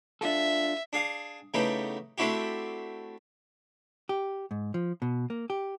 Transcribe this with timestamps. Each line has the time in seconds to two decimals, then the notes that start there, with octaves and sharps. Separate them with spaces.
0.21 D4 F4 A4 E5
0.93 D4 G#4 F5 D#6
1.54 C#3 E3 A3 B3 D#4 G4
2.18 A3 C4 D4 E4 F#4 G4
4.09 G4
4.51 G#2
4.74 F3
5.02 B2
5.30 A#3
5.50 G4